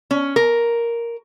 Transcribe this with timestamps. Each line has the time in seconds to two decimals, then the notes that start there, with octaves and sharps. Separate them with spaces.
0.11 C#4
0.36 A#4